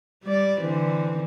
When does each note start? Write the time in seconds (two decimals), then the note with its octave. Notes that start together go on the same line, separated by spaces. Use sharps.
0.23 G3 D5
0.60 D3 E3 C4